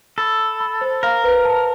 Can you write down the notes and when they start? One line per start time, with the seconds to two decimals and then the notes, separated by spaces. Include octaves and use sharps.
0.18 A4 B5
0.39 B5
0.60 B5
0.81 C5
1.03 A#4 F5
1.24 B4
1.45 A5